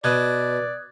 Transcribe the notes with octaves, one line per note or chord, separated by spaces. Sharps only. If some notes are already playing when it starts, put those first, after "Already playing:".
B2 B4 D5 D#6 F#6 G#6